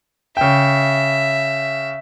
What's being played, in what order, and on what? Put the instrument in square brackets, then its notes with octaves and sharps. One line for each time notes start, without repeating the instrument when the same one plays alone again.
[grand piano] C#3 G5 [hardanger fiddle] E5